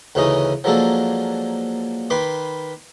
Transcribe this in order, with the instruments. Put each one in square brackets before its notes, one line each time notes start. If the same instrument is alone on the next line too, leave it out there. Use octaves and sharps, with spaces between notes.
[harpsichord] D2 C#3 E3 C#4 D#4 D#5
F3 F#3 G#3 A#3 D4 A4
D#3 B4 B5 C6 D6